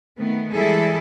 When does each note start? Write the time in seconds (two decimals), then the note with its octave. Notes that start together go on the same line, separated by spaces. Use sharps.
0.17 D#3 A3 B3
0.52 E3 G3 G#3 E4 G#4 A4